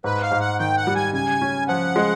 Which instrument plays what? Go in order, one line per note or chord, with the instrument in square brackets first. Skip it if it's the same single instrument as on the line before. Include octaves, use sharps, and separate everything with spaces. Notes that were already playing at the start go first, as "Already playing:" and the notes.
[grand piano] G#2 [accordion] B4
[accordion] F5
[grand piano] G#2
[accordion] F#5
[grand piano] D#3 [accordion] G5
[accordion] F#5
[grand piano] G3
[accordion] G#5
[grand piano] C#3 [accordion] G#5
[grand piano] C#4
[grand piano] F3 [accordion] F#5
[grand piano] G#3